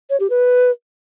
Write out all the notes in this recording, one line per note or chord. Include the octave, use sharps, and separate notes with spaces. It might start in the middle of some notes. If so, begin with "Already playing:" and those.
C#5
G4
B4